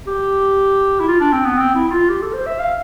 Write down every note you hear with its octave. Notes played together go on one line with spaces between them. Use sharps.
G4
E4
F4
D4
C4
B3
C4
E4
E4
F4
G4
A4
C5
E5
F5